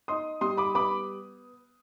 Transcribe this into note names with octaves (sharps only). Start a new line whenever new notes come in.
D#4 C6 D#6
G3 C6 D#6
B5 D6
B3 B5 D6